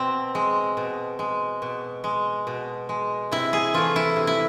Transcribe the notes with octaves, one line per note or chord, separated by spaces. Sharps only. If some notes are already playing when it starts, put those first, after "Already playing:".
Already playing: B2 C4
G#3
B2
G#3
B2
G#3
B2
G#3
C3 E4
G#4
E3 A3 F4
E4
C3
E4